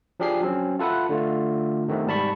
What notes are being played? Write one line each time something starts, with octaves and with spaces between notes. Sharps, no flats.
F3 D4 G4 G#4 C7
F#3 C4 C#4
F4 A4 B4 E5 F#5
D3 A3 F4
C3 D#3 A3 B3 C4
G#2 G3 A5 B5 C#6